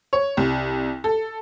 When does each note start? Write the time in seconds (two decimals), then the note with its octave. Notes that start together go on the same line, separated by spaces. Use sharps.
0.13 C#5
0.37 C2
1.04 A4